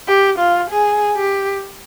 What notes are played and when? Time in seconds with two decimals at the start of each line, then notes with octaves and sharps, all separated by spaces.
0.08 G4
0.39 F4
0.70 G#4
1.17 G4